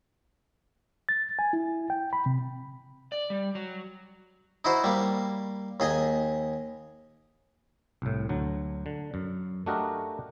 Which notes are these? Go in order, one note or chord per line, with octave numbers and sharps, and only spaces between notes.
A6
G#5
E4
G5
B5
C3
D5
G3
F#3
D#4 E4 F#4 C5
G3 A#3
D#2 G#4 D#5 G#5
C2 A2
D2 F#3
D3
F#2
A3 D4 F#4 G4 A#4 D#5